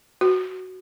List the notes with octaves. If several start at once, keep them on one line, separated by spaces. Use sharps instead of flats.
F#4